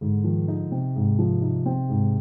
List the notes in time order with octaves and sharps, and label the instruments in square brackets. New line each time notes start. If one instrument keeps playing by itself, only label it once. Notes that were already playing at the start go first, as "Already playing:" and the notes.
[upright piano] G#2 [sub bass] D3
[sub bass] D#3 [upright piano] F3
[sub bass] D3 [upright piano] D#4
[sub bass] C3 [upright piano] C4
[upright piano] G#2
F3
D#4
C4
G#2